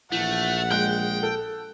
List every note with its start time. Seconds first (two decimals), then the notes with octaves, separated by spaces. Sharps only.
0.12 A#1 E3 A3 F#5
0.71 G#3 G5 F#6 G7
1.23 A4